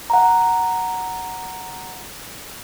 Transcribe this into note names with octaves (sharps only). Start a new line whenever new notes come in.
F#5 A#5